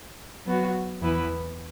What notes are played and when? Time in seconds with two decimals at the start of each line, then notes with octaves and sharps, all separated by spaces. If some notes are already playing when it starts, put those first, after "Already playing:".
0.45 F#3 B3 F#4
1.00 E2 E3 B3 E4 B4